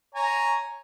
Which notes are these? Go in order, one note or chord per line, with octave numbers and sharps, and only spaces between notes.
C#5 G#5 A#5